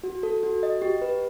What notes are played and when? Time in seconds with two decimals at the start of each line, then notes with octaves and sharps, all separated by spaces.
0.04 F#4
0.23 A4
0.43 F#4
0.63 D#5
0.82 G4
1.02 B4